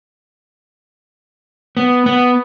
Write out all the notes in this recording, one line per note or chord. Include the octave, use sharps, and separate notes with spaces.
B3
B3